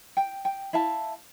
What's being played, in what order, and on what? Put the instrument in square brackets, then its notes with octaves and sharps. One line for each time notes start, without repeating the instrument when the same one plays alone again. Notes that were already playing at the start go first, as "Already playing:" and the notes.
[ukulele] G5
G5
E4 E5 F5 A5